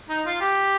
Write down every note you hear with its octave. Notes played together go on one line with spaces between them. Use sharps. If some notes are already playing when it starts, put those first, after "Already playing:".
D#4
F4
G4